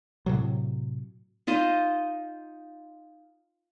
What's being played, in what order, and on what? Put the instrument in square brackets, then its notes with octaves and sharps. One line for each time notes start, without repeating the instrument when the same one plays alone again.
[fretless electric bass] A2 C3 F#3
[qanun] D#4 F4 C5 D#5